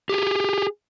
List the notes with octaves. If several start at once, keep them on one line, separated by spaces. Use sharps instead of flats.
G4 G#4